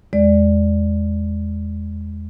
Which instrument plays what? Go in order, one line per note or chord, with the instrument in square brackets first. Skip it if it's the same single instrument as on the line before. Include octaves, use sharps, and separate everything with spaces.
[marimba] E2 G#3 D5